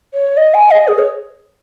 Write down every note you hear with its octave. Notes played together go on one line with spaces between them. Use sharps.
C#5
D#5
G#5
D#5
G#4
C#5